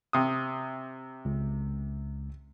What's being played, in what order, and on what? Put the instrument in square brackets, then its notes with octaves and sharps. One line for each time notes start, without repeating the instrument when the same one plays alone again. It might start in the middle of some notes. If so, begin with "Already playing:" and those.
[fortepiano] C3 D#6
[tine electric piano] C#2